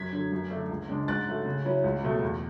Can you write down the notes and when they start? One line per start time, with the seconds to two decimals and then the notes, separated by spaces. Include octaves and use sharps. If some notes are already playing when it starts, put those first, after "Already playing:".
Already playing: F#2 G#6 B6
0.13 D3 F#3
0.32 F#2
0.51 D3 A3 D4
0.69 C#2
0.89 C#3 G#3 D4
1.08 G#2 F#6 A6
1.27 F#3 A3
1.45 C#3
1.65 F#3 C#4 E4
1.84 C#2
2.03 B2 F#3 A3
2.22 E2